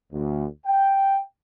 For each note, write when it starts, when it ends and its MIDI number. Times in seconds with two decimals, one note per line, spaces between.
0.13 0.46 38
0.67 1.19 79